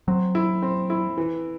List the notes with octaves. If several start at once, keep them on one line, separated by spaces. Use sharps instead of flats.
F#3 C4
E4
C4
E4
E3